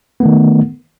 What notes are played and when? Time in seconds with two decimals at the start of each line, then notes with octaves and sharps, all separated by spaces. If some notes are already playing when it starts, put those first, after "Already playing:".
0.20 B3
0.23 A3
0.25 D#3